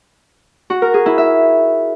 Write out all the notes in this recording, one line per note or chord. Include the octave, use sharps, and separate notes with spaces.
F#4
A#4
G#4
E4
E5